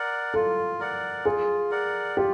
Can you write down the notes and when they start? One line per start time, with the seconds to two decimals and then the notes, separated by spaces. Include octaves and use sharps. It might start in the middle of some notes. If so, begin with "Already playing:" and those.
Already playing: A#4 D5 F#5
0.34 F4 A4
0.80 A#4 D5 F#5
1.25 F4 G#4
1.71 A#4 D5 F#5
2.17 F4 G4